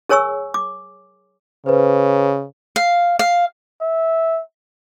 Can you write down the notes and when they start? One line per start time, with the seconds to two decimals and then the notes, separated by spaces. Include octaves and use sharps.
0.09 G#4 A#4 C#5 G#5 C#6 E6
0.54 D6
1.66 C#3 B4 C5
2.76 F5
3.19 F5
3.81 E5